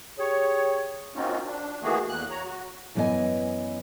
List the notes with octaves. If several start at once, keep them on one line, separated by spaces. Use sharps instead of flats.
G4 G#4 C#5
A#3 C4 C#4 D#4 F4 F#4
D4
D#3 E3 A3 A#3 F#4 G#4
E2 A#3 F#6
C#5 A#5
F#4
F#2 E3 B3 A#4 D#5 G#5